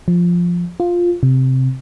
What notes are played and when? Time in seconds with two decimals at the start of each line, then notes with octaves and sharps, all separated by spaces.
0.08 F3
0.80 F4
1.23 C3